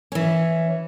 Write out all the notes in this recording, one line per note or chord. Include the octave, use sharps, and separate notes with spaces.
E3 C#4